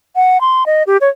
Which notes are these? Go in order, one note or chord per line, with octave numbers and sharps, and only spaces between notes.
F#5
C6
D#5
G4
C#5